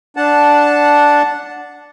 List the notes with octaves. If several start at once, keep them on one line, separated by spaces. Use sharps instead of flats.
D4 F#5 A5